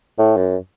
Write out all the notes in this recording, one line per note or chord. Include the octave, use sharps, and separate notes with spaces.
A2
F#2